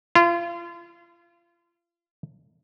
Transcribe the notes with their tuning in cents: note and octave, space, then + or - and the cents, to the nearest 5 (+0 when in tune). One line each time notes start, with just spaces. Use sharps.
F4 -35